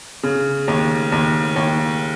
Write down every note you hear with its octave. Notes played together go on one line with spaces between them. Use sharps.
C#3
D#2
D#2
D#2